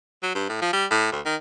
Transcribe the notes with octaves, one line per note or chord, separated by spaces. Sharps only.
F#3
G2
A2
F3
G3
A2
D2
D#3